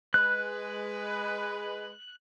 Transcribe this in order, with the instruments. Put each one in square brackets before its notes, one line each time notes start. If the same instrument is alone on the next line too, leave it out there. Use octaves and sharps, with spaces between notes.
[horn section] G#3 B4 [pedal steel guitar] F#6